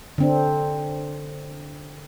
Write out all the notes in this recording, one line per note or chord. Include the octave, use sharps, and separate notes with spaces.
D3 C4 D4